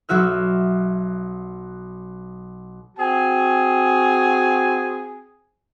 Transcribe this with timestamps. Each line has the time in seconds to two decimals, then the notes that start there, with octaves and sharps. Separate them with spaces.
0.09 B1 F#3 F#4 E5 F6
2.97 C4 F#4 G#4 G#5